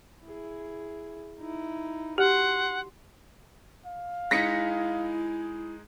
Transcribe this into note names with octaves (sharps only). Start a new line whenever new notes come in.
E4 G#4
D#4 E4
F#4 G4 F#5 C6
F5
G#3 D#4 E4 G#4 A#6 B6 C#7